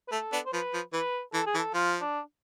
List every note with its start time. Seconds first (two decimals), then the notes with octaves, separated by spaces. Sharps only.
0.08 B4
0.12 A3 A4
0.33 B3 D4
0.46 C5
0.53 F3 B4
0.74 F3
0.93 E3 B4
1.34 E3 A4
1.46 G#4
1.55 E3
1.58 A4
1.74 F3 F4
2.01 D4